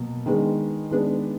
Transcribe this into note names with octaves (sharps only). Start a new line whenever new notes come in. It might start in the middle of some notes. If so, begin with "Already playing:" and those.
Already playing: B2 F#3 A#3
D#3 G#3 B3 D4
D#3 G#3 B3 D4